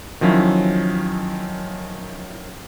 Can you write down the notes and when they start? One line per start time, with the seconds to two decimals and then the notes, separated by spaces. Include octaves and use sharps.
0.21 D#3 F3 F#3 C#4 E4